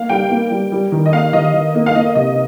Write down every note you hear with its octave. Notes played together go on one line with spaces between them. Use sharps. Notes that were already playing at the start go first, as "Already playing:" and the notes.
Already playing: A#3 F5
G3 G5
A#3
G3
G3
D#3
D#5
A#3 F5
D#3 D#5
D#3
A#3
F5
A#3 D#5
C3 D#5